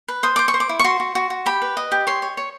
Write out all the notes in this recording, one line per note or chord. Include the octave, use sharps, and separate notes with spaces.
B4
C5 D#6
C5 D6
C#6
C5
D6
E4
C#6
F#4 C6
F#4
F#4
F#4
G4 B5
B4
D#5
G4
C#5 C6
C#5
C#5